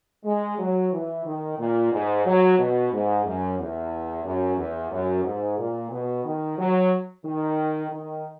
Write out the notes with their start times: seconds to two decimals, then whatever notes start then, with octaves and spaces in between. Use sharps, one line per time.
0.25 G#3
0.58 F#3
0.92 E3
1.25 D#3
1.58 A#2
1.91 G#2
2.25 F#3
2.58 B2
2.92 G#2
3.25 F#2
3.58 E2
4.24 F#2
4.57 E2
4.91 F#2
5.24 G#2
5.58 A#2
5.91 B2
6.24 D#3
6.57 F#3
7.24 D#3
7.90 D#3